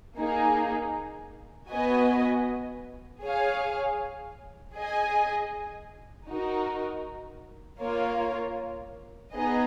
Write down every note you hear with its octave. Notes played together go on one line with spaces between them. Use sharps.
A#3 D#4 G#4
B3 F#4 B4 D#5 G#5
G#4 C#5 F5 G#5
G#4 D#5 G#5
D#4 F#4 A#4
A#3 F4 A#4 C#5 F5
B3 D#4 G#4 D#5